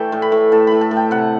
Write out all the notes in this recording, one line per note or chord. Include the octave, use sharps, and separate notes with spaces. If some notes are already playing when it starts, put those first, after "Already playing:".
Already playing: E3 A3 D5 E5 G5 A5
A2
B5
A2
A2 A5
A2 B5
A5
A2
G5
C3 F#5